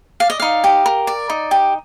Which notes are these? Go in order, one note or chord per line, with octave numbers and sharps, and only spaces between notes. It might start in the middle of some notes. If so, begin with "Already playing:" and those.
D5 F5
D#5
D#4 F5
G4
A#4
D5
D#4
G4